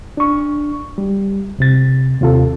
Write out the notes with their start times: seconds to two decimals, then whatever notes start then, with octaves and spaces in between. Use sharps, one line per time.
0.17 D4 C#6
0.98 G3
1.59 C2 C3 A6
2.21 D#2 C3 F4 A4